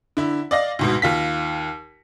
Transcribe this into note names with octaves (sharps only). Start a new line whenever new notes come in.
D3 E4
D5 D#5 F5 A#6
D2 G#2 B2
D#2 F4 B6